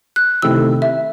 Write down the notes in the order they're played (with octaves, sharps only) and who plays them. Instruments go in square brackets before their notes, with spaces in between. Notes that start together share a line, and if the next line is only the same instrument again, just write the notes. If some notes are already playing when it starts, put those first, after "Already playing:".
[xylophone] F#6
[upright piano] C3 D#3 A3 C4 E4 [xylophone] E6
[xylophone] E5